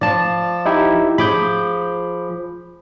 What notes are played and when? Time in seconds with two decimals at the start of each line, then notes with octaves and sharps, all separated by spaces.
0.01 F3 F4 D5 A5
0.66 D#4 E4 G4
1.18 F3 G#4 B5 D6 G6